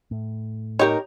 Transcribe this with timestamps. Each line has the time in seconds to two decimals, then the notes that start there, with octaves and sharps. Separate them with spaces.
0.11 A2
0.79 D#4 G4 A#4 C#5